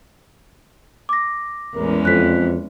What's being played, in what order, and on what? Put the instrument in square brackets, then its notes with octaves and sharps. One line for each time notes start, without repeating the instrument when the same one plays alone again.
[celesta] D6 A#6
[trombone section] A1 A#4 [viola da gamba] E2 G#3 C#4
[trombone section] F2 [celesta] F#6 B6